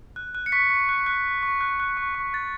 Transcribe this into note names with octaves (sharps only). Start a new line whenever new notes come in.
F#6
F#6
C#7
C#6 B6
C#6
F#6
F#6
C#6
C#6
F#6
F#6
C#6
C#6
F#6 A6